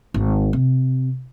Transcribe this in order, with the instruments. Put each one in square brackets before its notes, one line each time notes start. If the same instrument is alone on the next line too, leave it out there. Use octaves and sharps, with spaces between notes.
[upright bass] G#1
C3